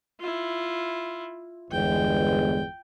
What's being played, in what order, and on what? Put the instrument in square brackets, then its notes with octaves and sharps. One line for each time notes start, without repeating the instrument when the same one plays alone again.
[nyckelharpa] E4 F4
[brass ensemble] G1 E2 G#3 [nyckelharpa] G5